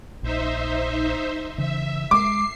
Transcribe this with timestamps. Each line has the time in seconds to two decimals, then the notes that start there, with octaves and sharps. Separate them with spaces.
0.23 A#1 D#4 C5 E5
1.58 C#3 E3 E5
2.11 G#3 D6 C7